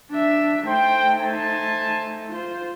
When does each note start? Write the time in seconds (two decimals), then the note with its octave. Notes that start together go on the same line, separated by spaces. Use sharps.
0.11 D4 E5
0.67 A3 D#4 C5 G5
1.19 C5 G#5 A5
2.32 F4 C5